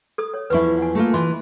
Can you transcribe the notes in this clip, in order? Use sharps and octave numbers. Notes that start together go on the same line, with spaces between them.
A4 D#6
C#5
E2 F3 E4 B4 C#6
F#5 G#5
A3 A#3 F4
E3 D#5 C6